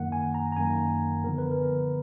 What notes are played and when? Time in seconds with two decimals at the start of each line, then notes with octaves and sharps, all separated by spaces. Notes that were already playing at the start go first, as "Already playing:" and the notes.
Already playing: F#2 D#3 A#3 F#5
0.12 G#5
0.34 A#5
0.52 A#5
0.56 F#2 D#3 A#3 G#5
1.24 D3 F3 B3 A#4
1.38 B4
1.51 A#4